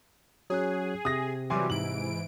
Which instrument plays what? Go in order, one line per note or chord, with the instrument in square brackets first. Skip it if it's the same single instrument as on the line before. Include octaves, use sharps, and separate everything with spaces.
[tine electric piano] F#3 C#4 F#6 [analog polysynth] G#4
[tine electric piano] C3 [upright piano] D#6 A#6
[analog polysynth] E3 F#3 G3 [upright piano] G#5 C6 D6
[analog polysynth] G#2 E3 D7 [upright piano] F#7